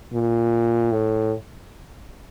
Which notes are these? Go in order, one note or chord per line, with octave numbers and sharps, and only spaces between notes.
A#2
A2